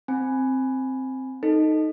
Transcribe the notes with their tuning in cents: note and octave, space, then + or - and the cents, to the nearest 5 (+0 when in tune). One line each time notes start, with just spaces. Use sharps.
C4 +0 G#5 +0 B5 +0
D#4 +0 A4 +0